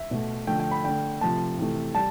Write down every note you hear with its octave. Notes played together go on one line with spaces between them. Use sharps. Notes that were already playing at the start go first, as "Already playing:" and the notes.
Already playing: E5
B2 A3
D3 F3 A3 G5
G5
B5
D3 A3 G5
C3 F3 A3 A5
C3 E3 A3
G3 A5